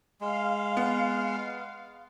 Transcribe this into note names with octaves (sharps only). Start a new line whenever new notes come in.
G#3 F5
B3